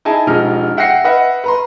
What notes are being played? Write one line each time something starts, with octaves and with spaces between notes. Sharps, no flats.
D#4 E4 G#4 G#5 A5
E1 F3 G#3 D#4 G4 F6
E5 F#5 G5 A#6 C7 C#7
B4 D#5 E5 F#5
B4 A#5 C6